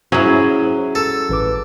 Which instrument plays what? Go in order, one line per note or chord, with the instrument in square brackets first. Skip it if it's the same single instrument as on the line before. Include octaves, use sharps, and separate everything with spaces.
[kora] F#3 G#4 [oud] C#4 E4
[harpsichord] A4
[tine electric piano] A1 B4 D6